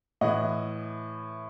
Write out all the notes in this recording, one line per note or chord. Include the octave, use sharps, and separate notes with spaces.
A2 E3 D#5 F#5